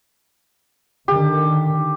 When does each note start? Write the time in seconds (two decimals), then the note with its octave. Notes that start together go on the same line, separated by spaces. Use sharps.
1.08 D3 D#3 G4